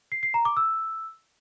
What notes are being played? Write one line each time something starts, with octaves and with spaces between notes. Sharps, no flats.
C7
C7
A#5
D6
E6